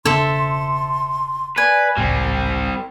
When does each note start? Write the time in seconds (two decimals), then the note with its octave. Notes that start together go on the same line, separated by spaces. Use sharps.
0.05 E1 C#3 D4 A4 C5 E5 C6
1.58 B4 D5 G#5
1.98 G#1 C#2 A2 G3 C4 G5